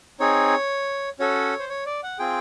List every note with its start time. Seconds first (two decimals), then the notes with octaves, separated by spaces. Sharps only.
0.20 C4 D#4 G#4 C#5
1.19 C#4 F#4 A4 C#5
1.59 C5
1.69 C#5
1.86 D5
2.03 F#5
2.19 C4 F4 G#4 G5